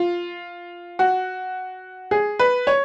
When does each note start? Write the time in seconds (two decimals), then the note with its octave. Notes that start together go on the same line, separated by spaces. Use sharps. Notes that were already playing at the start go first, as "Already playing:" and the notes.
Already playing: F4
0.99 F#4
2.11 G#4
2.39 B4
2.67 C#5